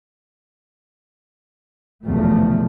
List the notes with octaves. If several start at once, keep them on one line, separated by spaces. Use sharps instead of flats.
F1 B1 E2 D3 F3 A3